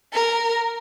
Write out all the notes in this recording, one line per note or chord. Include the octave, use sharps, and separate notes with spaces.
A#4